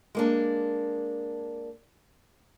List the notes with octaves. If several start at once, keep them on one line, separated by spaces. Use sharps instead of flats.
G#3 A#3 D4